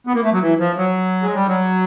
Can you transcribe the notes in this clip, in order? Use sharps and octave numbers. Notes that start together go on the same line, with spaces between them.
B3
A#3
A3
F#3
E3
F3
F#3
G#3
G3
F#3